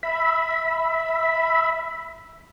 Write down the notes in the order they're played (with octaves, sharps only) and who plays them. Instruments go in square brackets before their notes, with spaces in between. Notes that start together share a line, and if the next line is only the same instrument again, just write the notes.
[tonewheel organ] E5 B5